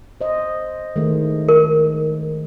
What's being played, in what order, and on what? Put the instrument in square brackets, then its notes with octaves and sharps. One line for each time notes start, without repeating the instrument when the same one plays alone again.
[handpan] C5 D#5
D#3 G#3 A3
[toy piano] A#4